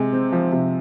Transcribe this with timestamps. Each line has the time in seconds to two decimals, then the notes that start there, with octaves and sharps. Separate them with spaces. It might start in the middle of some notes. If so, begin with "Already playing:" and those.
Already playing: C3 G#3
0.13 C4
0.32 F3
0.52 C3